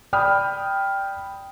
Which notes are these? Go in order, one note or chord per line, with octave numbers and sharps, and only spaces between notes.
D5 G5 B5 D#6 F6